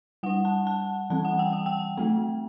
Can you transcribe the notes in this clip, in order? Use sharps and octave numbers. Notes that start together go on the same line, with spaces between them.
G3 D4 F#5
A5
A5
E3 G3 C4 A5
F#5
G5
F#5
G5
F#3 A3 C4